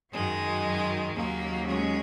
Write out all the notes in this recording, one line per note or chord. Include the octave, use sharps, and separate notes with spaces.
F#2 D#3 F#3 G#3
D#2 C#3 F#3 A#3
G#3 C#4